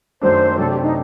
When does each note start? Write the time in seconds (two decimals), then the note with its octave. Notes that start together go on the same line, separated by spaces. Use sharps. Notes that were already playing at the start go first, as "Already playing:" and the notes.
0.21 F#2 D#3 F#3 A3 D4 C5
0.58 C3 F#3 A3 D4 A4
0.70 G4
0.82 D#4